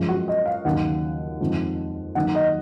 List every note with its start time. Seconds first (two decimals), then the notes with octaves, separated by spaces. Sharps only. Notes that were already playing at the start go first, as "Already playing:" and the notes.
Already playing: F#2 F3 G#3
0.09 F#4
0.28 D#5
0.46 F5
0.65 D#2 C#3 F#3 F#5
1.41 F2 D#3 G#3
2.15 D#2 D#3 F#3 F#5
2.35 D#5